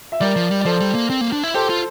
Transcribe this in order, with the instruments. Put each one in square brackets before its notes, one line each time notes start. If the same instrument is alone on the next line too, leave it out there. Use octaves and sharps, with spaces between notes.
[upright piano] E5
[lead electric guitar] G3 [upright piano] A#4 D5
[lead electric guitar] F3
G3
[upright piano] D5
[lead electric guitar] F3 [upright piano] A4 C5
[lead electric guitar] G3
A#3
C4
A#3
D4
E4
[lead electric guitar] G4 [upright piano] A4 C5
[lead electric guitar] F4